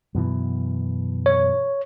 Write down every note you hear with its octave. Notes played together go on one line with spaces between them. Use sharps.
F#2 B2 E3
C#5